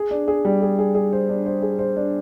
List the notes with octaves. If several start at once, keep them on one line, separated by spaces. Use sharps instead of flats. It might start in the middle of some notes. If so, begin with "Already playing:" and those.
Already playing: G#4
D4
G#4
G3
G#4
G#4
G#4
C5
D4
C5
G#4
C5
D4